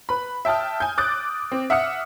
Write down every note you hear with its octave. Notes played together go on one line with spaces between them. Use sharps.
B4 B5
E5 G5 A5 D#6 F6
G#5 G6
D6 D#6 F#6 A6
C4
E5 F#5 D#6 F6 C#7